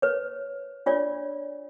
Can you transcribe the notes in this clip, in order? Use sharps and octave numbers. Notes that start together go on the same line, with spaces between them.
B4 C#5
D4 F4 C#5 D5